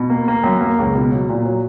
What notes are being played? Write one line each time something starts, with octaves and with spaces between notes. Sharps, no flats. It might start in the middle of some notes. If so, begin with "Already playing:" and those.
Already playing: B2
A#3
A#3
F#2
A#3
C#2
B2
F#3
A#2
F#3